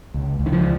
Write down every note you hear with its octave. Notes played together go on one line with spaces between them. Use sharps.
C#2
C#2
D#3
F3